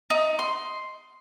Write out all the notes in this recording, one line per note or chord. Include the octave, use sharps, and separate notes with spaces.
D#4
C6